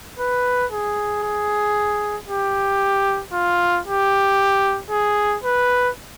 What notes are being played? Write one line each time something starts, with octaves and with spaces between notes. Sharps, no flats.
B4
G#4
G#4
G4
F4
G4
G#4
B4